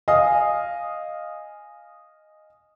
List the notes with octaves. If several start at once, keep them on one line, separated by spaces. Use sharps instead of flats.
D#5 F5 G#5 D#6